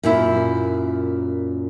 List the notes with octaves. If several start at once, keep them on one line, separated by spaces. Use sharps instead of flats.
F#2 A#2 E4